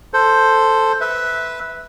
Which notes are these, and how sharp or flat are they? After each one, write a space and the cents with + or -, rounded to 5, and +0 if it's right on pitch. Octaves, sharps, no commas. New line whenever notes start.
A4 +10 C5 +0
B4 +0 E5 -10